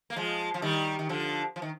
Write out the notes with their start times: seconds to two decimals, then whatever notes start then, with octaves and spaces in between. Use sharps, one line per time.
0.10 A#3
0.16 F3 G#3
0.54 F3
0.62 D#3 G3
0.99 D#3
1.09 D3 F3
1.56 F3
1.62 D#3